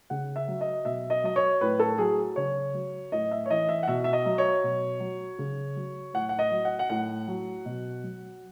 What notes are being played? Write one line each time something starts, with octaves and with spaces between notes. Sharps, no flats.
C#3 F#5
E5
F#3
D#5
B2 E5
D#5
F#3 D#5
C#5
A2 B4
A4
F#3 G#4
C#3 C#5
F#3
A2 D#5
E5
C#5
E3 D#5
E5
F#5
B2 E5
E5
D#5
F#3
C#5
B2
F#3
C#3
F#3
A2 F#5
F#5
D#5
F#3
F#5
F#5
A2 F#5
F#3
B2
F#3